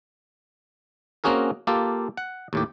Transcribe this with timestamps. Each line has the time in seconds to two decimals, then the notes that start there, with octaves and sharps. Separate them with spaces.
1.24 A#3 C4 C#4 F#4 G#4 A#4
1.67 A#3 F4 G4 A4
2.17 F#5
2.53 D#2 A2 G4